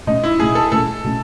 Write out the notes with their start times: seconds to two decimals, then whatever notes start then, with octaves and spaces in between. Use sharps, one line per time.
0.07 B2 A3 C#4 D#4
0.23 E4
0.39 B2 A3 C#4 G#4
0.55 A4
0.72 B2 A3 C#4 A4
1.04 B2 A3 C#4